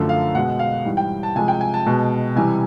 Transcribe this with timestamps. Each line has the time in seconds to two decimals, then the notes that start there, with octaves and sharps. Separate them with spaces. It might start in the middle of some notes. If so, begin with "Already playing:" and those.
Already playing: F#2 D3 F3 A3
0.09 F5
0.34 B2 G#3 F#5
0.59 F5
0.85 G#2 E3 G3
0.97 G5
1.23 A5
1.36 C3 F3 G#3 G#5
1.48 G5
1.61 G#5
1.74 A5
1.86 B2 G#3
2.36 C3 E3 G3 G#5